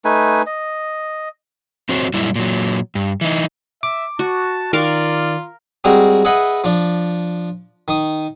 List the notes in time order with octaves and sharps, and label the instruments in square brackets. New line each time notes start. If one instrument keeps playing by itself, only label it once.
[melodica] A3 D#4 B4 G#5
D#5
[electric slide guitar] F2 C4 F#4 C5 C#5
F#2 A#2 G3 E4
A#2 F#3
G2
E3 D#4
[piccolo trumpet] E5 [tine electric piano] D6
[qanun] F#4 [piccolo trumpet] A5
[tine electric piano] D#3 [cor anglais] F4 [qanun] A#4 F5 D6 [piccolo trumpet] D5
[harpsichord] G3 G#3 C4 F#4 G#4 A#4
G#4 B4 D#5 E5 F#5 B5
F3 D4
D#3 D#6